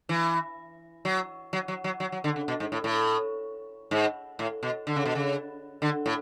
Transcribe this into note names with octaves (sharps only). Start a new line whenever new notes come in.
E3
F#3
F#3
F#3
F#3
F#3
F#3
D3
C#3
B2
G#2
A2
A2
G#2
A2
B2
D3
C#3
B2
C#3
D3
A2